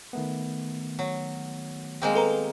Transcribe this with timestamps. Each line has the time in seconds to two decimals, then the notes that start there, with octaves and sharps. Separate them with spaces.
0.13 D#3 A3 B3
0.99 F#3
2.02 G#3 A#3 C4
2.15 A4 B4 A#5